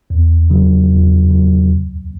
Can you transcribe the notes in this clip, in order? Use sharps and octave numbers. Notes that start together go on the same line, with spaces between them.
E2
C#3 F#3
E2
C#3 F#3
D2